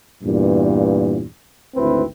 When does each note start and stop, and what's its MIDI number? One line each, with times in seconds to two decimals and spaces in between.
0.23 1.23 40
0.23 1.23 43
0.23 1.23 46
1.75 2.03 32
1.75 2.03 38
1.75 2.03 60
1.75 2.03 64
1.75 2.03 71